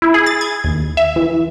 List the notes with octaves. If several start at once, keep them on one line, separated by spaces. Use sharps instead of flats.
E4
G#4
A6
G#6
D#2
E5
E3